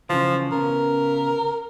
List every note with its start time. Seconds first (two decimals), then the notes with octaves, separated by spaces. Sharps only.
0.10 C#3 E3 F3
0.52 C#3 B3 A#4